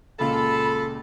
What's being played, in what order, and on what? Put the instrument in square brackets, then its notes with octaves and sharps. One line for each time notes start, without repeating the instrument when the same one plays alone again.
[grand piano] C#2 A#2 [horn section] F4 A4 [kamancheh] B5